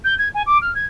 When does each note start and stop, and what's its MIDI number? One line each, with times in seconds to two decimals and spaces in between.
0.04 0.14 91
0.18 0.28 92
0.34 0.42 80
0.46 0.58 86
0.61 0.72 89
0.74 0.85 92